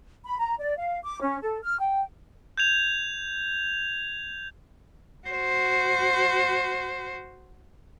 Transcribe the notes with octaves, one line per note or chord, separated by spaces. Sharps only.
B5
A#5
D5
F5
D6
C#4
A4
F6
G5
G6 G#6 F7
F#4 C5